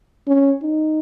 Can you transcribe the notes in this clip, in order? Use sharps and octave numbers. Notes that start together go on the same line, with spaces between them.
C#4
D#4